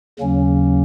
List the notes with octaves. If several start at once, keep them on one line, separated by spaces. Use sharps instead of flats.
D#2 C#3 F#3 A#3 C#4